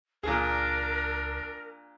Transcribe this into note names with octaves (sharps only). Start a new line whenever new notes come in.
C#2 A#2 D4 G#4 A#4